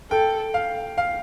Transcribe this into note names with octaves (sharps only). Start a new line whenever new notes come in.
A4 G5
F5
F5